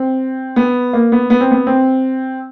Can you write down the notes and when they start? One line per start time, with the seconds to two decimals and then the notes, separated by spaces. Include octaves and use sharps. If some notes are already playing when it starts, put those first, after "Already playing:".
Already playing: C4
0.56 B3
0.93 A#3
1.12 B3
1.30 B3
1.40 C4
1.51 B3
1.67 C4